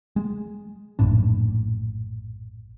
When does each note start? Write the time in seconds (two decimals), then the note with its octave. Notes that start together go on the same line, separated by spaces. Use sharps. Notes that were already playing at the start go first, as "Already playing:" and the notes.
0.16 G#3
0.99 A#1 F#2 A2 D4